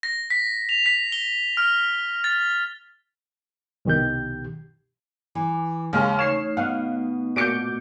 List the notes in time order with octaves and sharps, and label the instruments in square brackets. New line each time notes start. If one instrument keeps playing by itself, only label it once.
[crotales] A#6
B6
F7
B6
G7
F6
A6
[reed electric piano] C2 B2 D#3 G4 G6
[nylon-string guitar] E3 [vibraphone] D6
[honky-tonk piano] D#2 G#3 F6 [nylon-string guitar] C#3 [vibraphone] F5 C6 C#6
[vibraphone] A3 D#4 [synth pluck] C#5 [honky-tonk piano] C7 E7
[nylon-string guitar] B2 [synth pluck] F5 F#5
[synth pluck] A#2 F#4 D6 [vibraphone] A3 [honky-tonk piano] G6 C#7 D7